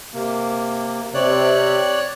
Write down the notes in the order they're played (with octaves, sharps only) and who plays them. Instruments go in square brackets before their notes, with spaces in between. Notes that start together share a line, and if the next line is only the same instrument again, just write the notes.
[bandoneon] C3 A#3
[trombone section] C3 [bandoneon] C#5 D5 F#6